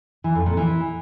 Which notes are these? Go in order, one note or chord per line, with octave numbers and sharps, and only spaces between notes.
E3
F2
A#2
E3